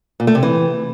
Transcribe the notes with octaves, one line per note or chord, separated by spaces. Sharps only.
A#2
A3
C3
E3